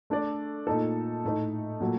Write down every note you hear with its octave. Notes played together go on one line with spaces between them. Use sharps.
A3 D4 A4 D5
A#2 A3 D#4 A4
A2 A3 D#4 A4
A#2 F#3 A3